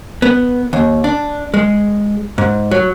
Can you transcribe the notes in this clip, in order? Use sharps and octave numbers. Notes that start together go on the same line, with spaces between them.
B3
D#2
D4
G#3
G#2
F#3